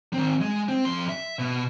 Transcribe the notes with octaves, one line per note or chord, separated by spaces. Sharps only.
D#3 C4
G#3
C4
F2 C6
E5
B2